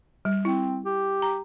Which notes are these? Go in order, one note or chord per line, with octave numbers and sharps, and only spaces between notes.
G3
C4 E4
G4
A#5